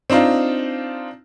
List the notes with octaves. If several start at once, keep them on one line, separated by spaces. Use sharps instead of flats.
C4 D4 D#4 F4